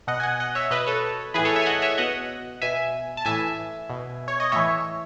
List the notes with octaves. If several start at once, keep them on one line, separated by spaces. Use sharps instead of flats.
B2 D#5 F#5
G#5
D#5 F#5
D#5 F#5
C#5 E5
B2 B4 D#5
A4 C#5
A2 E3 G#4 B4
A4 C#5
C#5 E5
G#5
D#5 F#5
C#5 E5
B2 D#5 F#5
B2 E5 G#5
A5
A2 E3 E5 G#5
B2
C#5
D#5
A2 E3 C#5 E5